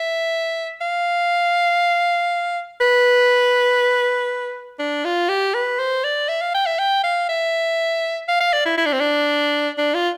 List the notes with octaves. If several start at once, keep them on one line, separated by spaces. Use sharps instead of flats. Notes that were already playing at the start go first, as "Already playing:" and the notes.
Already playing: E5
F5
B4
D4
F4
G4
B4
C5
D5
E5
F5
G5
E5
G5
F5
E5
F5
F5
D5
E4
E4
D4
C4
D4
D4
F4